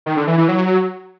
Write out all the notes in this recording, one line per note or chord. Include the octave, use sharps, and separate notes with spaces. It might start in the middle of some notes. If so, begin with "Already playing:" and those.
D#3
D3
E3
E3
F#3